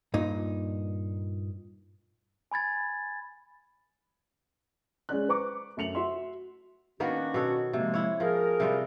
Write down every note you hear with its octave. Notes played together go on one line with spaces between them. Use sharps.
G2 A#2 D#4
G#5 B5 G#6 A6
G#3 C#4 D5 F#6
B4 A#5 C#6 D6
F#2 A3 C#7 F7 F#7
F#4 E5 C6
D#3 A#3 B3 C#4 D4 F#4
B2 A4 C#5
C3 F3 G#3 A#3
E4 C#5
F3 G#4 A#4
C3 G3 F4